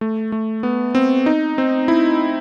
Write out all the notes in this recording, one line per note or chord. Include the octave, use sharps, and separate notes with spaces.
A3
A3
B3
C4
D#4
C4
E4